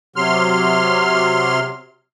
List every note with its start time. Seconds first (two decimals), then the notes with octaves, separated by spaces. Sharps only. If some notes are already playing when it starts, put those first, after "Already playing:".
0.16 C3 F#3 C6 F6